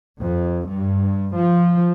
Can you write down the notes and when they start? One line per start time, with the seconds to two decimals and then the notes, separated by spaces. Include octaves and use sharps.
0.21 F2
0.69 G2
1.37 F3